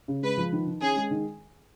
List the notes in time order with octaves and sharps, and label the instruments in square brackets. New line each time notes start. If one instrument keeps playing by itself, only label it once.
[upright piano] C#3
[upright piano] G#3 [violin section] B4
[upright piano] F3
D#3
D#3
[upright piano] C#4 [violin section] G#4
[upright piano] G#3
D#3